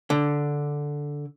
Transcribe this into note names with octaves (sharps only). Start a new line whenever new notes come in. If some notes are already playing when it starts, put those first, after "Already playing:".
D3